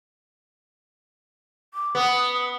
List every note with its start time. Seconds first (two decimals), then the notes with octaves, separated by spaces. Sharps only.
1.74 D6
1.95 B3 D#6